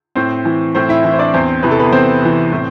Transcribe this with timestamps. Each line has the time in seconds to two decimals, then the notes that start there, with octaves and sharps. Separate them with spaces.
0.15 A2 C4 C5
0.45 E3
0.75 A2 C4 C5
0.89 E4 E5
1.04 E3
1.13 C5
1.19 D4 D5
1.34 E2 C4 C5
1.63 C3 E3 B4
1.71 A4
1.79 B3 B4
1.92 E2 C4 C5
2.22 C3 E3
2.52 A2